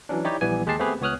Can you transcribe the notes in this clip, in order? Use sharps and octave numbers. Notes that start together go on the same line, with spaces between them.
E3 F#3 C#4 D4
D#4 E4 G4 C#5 D5
A#1 E3 G3 B3 G#5
D#2 G#3 G4 G#4 A5 C7
A3 B3 C4 G4 G#4 B4
C#2 B3 C#5 D#6 F6 F#6